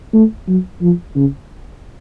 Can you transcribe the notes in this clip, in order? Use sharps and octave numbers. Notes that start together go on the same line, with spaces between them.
A3
F#3
F3
C#3